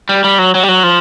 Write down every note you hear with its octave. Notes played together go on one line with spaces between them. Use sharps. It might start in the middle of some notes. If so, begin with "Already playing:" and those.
G3
G3
F#3
F#3
G3
F#3
F3